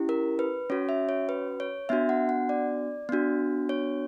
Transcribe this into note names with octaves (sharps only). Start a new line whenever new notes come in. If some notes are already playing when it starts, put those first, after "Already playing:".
Already playing: C#4 E4 G4
A#4
B4
C#4 F#4 C#5
E5
C#5
B4
C#5
B3 D4 F#4 E5
F#5
F#5
D5
B3 D4 F#4
C#5